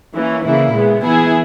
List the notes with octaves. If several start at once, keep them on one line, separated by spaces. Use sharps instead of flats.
E3 A#3 C#4
C#3 E3 A#3 E4
A#2 G#3 B3
E3 B3 E4 G#4